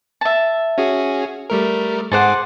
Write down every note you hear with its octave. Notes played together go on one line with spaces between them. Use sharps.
E5 A5
C#4 F#4 G#4
G3 A3 A#4
G#2 G#4 A4 C5 F#5 D6